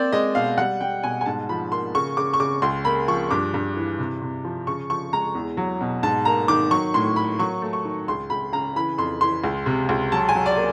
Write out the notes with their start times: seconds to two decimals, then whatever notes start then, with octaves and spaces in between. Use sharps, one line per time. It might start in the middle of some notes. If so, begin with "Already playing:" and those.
Already playing: A#3 C4 D5
0.12 G#3 D#5
0.35 B2 F5
0.58 G3 F#5
0.81 G3 G5
1.03 B2 G#5
1.21 G#5
1.26 G#2 A5
1.49 F3 B5
1.72 A#3 C6
1.95 C#3 C#6
2.17 C#3 D6
2.33 C#6
2.40 C#3 D6
2.62 C#2 C6
2.85 A#3 B5
3.08 F3 C#6
3.31 G2 D6
3.54 G2
3.77 E3
3.99 C3
4.22 C3
4.44 F3
4.67 C#3 C#6
4.90 F3 C#6
5.13 G#3 A#5
5.35 E2
5.57 F#3
5.81 B2
6.03 G#2 A5
6.25 A#3 A#5
6.48 D#3 D6
6.71 F#3 C#6
6.94 A2 C6
7.16 A#3 B5
7.39 F#3 C#6
7.62 A3
7.73 C#6
7.85 D#3
8.08 C#2 C6
8.30 C#2 B5
8.52 C#3 A#5
8.76 E3 B5
8.98 F2 C6
9.21 E3 C6
9.44 C#2
9.66 C3
9.89 C#2
10.12 F#3 A5
10.29 G#5
10.35 F#3
10.46 D5
10.57 A#3